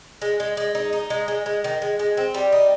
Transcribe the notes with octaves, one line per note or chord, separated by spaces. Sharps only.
G#3
G#3
G#3
D#4
D#4
G#3
G#3
G#3
D#3
G#3
G#3
C4
G3
D#4